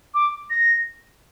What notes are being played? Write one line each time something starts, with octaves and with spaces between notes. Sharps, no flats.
D6
A#6